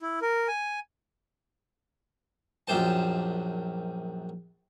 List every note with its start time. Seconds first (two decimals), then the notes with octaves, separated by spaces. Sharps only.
0.01 E4
0.22 A#4
0.48 G#5
2.68 A#1 F#2 G4 C5 A5